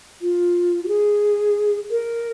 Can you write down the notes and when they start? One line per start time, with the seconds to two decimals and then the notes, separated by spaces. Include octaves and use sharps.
0.22 F4
0.84 F#4
0.88 G#4
1.91 A#4